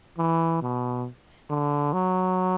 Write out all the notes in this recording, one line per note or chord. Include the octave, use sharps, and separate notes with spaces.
E3
B2
D3
F#3